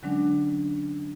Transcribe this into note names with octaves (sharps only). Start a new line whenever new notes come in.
D3 F#3 G#3 C#4 D4